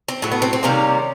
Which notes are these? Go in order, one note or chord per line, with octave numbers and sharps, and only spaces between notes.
C4
A2 F#3 A3
B3
C4
C4
C3 D#3 G3 A#3 C#4